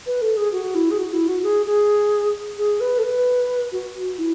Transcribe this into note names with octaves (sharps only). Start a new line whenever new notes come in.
B4
A4
G#4
F#4
E4
G#4
F#4
E4
F#4
G#4
G#4
G#4
B4
A4
B4
F#4
E4